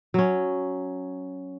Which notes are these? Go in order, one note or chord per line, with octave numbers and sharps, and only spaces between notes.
F#3 C#4